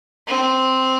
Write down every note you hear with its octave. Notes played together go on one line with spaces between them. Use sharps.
C4